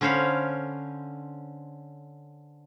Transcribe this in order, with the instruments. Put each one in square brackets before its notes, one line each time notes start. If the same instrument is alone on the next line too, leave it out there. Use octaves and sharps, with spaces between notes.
[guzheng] D3 C#4 C5 C#5 F5 B5